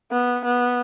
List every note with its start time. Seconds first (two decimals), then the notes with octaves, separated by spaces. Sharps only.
0.12 B3
0.45 B3